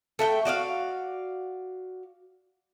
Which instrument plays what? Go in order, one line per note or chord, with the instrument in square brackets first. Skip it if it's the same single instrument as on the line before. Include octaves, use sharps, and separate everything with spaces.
[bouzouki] A3 E5 F#5 G5
F#4 D5 D#5 F5